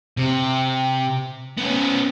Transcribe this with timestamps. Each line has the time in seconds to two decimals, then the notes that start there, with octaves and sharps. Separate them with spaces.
0.17 C3
1.58 B3 C#4